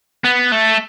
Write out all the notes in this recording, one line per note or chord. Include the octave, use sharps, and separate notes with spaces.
B3
A3